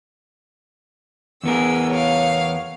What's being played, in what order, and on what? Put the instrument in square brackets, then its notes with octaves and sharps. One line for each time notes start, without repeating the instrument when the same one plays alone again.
[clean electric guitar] E2 B3 A#4 [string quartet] G#4 E6
[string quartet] C#5 F5